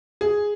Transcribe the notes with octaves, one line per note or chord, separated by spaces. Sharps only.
G#4